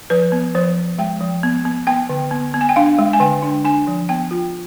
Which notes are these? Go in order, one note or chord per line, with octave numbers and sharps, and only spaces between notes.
F3 B4
B3
F3 C5
F3
G#3 G5
F3
B3
B3
B3 G5
D3
B3
B3
G#5
G5
D4 F5
G#3
G#5
D3 G5
D4
D4 G#5
F3
B3 G5
F4